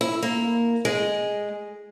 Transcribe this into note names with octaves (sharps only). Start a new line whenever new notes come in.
E4
A#3
G#3